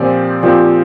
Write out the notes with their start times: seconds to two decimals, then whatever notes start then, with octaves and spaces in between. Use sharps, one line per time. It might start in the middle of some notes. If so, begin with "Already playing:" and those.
Already playing: A#2 F3 C4 G4 D5
0.43 A#2 F3 C4 G4 D5